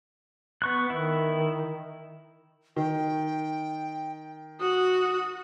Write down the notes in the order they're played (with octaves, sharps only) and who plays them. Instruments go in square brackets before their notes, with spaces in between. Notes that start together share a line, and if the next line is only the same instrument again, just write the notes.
[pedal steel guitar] B3 C#6 F#6
[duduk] D#3 [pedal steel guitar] E4
[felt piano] D#3 [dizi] G5
[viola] F#4 [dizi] D#6